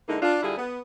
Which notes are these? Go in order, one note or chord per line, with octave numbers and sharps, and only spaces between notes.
D3 G#3 A#3 D#4 E4
D4 F4
D3 G3 E4 F4 G#4
B3